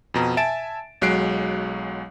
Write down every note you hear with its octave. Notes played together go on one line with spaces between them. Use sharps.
F2 B2 A#5
E5 G#5 A5 A6 D7 E7
B1 F#3 G#3 F#6 C7 D7